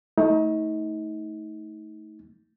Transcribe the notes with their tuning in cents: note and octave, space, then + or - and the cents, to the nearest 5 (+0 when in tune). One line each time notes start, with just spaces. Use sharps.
A3 +0 D#4 +35